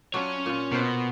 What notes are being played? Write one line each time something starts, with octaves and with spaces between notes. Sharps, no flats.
F#3 C#4 D4 F4 C#5
A#2 F4
B2 A#4 C5